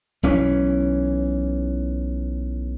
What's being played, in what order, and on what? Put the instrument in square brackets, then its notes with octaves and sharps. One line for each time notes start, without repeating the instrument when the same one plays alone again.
[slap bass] B1 E3 C#4